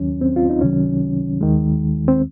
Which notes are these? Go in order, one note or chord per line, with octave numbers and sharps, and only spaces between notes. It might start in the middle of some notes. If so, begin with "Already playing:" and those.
Already playing: D#2 D#3 F#3 C#4
C4
F4
D#4
C#2 C3 D#3 F#3 C#4
D#2 D#3 G#3
C4